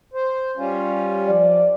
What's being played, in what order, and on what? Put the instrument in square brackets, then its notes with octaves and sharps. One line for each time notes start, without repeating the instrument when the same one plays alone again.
[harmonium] C5
G3 C#4 F4
[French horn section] F3 D5